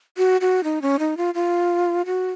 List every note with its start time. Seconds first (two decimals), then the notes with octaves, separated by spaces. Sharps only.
0.17 F#4
0.41 F#4
0.64 D#4
0.82 C#4
0.99 D#4
1.17 F4
1.34 F4
2.06 F#4